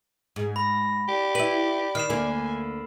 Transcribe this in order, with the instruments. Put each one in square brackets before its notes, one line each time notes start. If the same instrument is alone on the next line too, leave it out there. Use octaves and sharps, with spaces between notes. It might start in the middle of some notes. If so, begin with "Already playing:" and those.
[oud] G#2 [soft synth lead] G#4
[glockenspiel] B5 [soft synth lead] A#6
[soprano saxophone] G4 [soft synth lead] D5
[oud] E4 B4 [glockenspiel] F#7
[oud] D#3 [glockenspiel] F6 C7 E7
[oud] D2 D3 A#3 [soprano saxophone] G#5